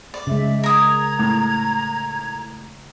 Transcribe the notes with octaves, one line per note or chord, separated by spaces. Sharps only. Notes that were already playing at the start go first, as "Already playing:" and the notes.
D5
C#3 G#3 E5
A#4 A#5 D#6 G#6
A2